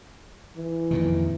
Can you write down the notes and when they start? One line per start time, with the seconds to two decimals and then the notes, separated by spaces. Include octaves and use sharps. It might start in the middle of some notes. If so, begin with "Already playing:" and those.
0.57 E3
0.91 F2 A#2 D#3